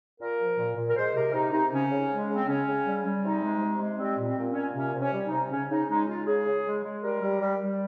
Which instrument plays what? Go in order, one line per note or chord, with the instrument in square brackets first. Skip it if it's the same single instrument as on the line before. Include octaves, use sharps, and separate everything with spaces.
[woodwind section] A#2 A#4
F3
A#2
A#2
A#4
G#3 C5
C3 A#4
C3 D#4
C3 D#4
C#3 C#4
C#3
G#3
C#3
C4
C#3 C#4
C#3
G3
G3
C3 D#4
G#3
C3
G#3
G3 C4
A#2
C4
A#2
C#4
A#2
C3 C#4
C3
C#4
G3
D#4
C3
C#3 C#4
C#3 D#4
G#3 D#4
G#3 F4
C#3 G#4
C#3
G#3
G#3
G3 A#4
G3
G3
G3